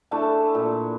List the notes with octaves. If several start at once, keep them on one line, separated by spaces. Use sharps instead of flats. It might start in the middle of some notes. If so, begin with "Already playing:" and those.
A3 D4 E4 A5
A#2